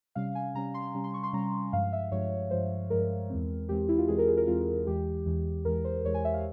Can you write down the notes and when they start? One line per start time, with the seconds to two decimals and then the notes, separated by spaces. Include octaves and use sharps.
0.15 C3 G3 C#4 F5
0.35 G#5
0.54 C3 G3 C#4 A#5
0.74 C6
0.95 C3 G3 C#4
1.04 C6
1.14 C#6
1.23 C6
1.33 C3 G3 C#4 A#5
1.73 G2 F3 G#3 F5
1.93 E5
2.11 G2 F3 G#3 C#5
2.51 G2 F3 G#3 C5
2.90 G2 F3 G#3 A#4
3.30 E2 E3 G#3 C4
3.69 E2 E3 G#3 C4 G4
3.89 E4
3.98 F4
4.08 E2 E3 G#3 C4 G#4
4.18 A#4
4.28 G#4
4.37 A#4
4.47 E2 E3 G#3 C4 F4
4.87 E2 E3 G#3 G4
5.26 E2 E3 G#3
5.65 E2 E3 G#3 A#4
5.84 C5
6.04 E2 E3 G#3 C#5
6.14 G#5
6.25 E5
6.34 F5